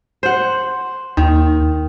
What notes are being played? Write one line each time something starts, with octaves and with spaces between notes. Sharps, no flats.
C5 F#5
D#2 D#3